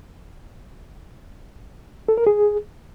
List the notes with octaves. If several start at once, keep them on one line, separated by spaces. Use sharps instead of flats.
A4
A#4
G#4